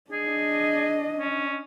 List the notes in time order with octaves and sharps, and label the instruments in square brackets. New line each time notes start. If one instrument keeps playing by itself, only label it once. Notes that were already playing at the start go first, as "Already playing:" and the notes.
[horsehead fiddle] D4 D#5 [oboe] G#4
[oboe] C#4